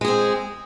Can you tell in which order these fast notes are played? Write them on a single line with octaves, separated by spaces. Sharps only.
G#3 G#4 C4